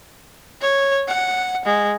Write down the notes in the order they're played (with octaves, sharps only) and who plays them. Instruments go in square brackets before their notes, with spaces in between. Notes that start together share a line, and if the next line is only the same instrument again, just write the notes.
[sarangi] C#5
F#5
G#3